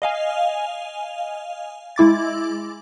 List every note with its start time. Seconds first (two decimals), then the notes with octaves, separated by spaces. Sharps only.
0.02 D#5 F5 G#5
1.96 G#3 E4 D6 A6